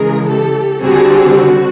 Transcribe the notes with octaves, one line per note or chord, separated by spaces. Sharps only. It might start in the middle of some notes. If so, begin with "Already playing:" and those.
Already playing: C#3 E3 G#3 G#4 A#4
G4 A4
D3 G3 C4 F#4 G#4
F#4